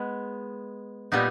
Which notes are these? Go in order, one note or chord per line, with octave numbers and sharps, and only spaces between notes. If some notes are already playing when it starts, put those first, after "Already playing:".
Already playing: G#3 B3
A#2 G3 B3 D#4